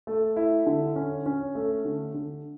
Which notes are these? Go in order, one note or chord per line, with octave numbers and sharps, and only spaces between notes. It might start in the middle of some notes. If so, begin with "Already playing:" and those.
A3
E4
D3
C#4
C#4
A3
D3
D3